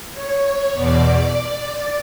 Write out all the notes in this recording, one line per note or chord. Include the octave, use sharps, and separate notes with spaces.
C#5
E2 B2 D5